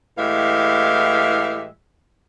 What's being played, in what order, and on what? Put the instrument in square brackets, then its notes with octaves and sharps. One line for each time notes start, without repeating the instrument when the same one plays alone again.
[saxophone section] A2 E3 G#3 G4 E5 F5